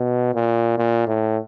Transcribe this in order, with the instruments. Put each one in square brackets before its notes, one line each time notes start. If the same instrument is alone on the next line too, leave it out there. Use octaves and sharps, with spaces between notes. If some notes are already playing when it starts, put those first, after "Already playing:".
Already playing: [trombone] B2
A#2
A#2
A2